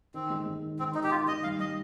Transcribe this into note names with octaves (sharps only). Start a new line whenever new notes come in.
D#3 C4
G#3
G#3
D#3
D#3 C4
D#3 D#4
G4
D#3 F4
D#3 D#5
G3 F5
G3 D#5